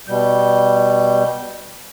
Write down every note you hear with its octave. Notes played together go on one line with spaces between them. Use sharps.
B2 G3 G6